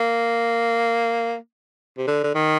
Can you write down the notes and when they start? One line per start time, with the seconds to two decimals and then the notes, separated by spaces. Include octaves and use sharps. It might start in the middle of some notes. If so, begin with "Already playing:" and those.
Already playing: A#3
1.98 C3
2.08 D3
2.24 D3
2.35 D#3